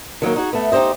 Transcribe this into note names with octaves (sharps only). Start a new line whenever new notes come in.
D#3 F#3 A#3 C#4
D#4 F#4 G#4
A3 B3
D#4 G4 G#4 C5 D#5